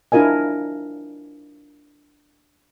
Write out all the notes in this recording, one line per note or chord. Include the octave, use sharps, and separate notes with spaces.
D4 E4 F4 A#4 D#5 G#5